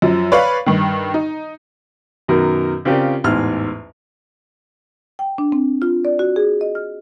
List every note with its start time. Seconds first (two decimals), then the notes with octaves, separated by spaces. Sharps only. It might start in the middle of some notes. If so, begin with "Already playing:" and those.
0.02 F#2 F3
0.32 B4 C#5 D5 F5 B5
0.66 G2 D#3
1.14 D#4
2.28 F#2 B2 D#3 A#4
2.85 C#3 C4 F4 G4 A#4 D5
3.24 A1 E2 G#2 E4 F6
5.19 G5
5.38 D4
5.52 C4
5.82 F4
6.05 D5
6.19 F#4
6.36 G#4
6.61 D#5
6.75 F6